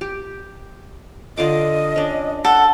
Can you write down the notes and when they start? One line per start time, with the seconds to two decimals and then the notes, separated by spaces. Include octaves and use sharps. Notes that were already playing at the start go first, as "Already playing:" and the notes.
0.01 G4
1.37 D3 F4 D#5 D6
1.96 C#4 D4
2.45 A4 F#5